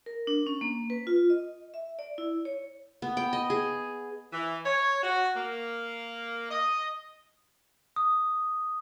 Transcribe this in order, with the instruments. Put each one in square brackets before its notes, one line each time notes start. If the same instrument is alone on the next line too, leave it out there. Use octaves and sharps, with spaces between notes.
[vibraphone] A#4
D4
C#4
A#3
B4
F4
D#5
E5
D5
E4
C#5
[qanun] B3
G5
D#5
G#4
[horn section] E3
C#5
F#4
A#3
D#5
[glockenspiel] D#6